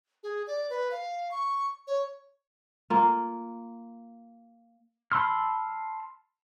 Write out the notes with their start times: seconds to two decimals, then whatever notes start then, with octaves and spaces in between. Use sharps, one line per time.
0.23 G#4
0.47 D5
0.70 B4
0.91 F5
1.31 C#6
1.87 C#5
2.90 A#3 F4
5.12 A5 B5 C6 E6 F6